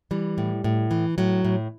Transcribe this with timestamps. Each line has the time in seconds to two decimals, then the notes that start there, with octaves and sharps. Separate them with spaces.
0.11 E3 G3
0.38 A2
0.64 A2
0.91 E3
1.18 A2 F#3
1.44 A2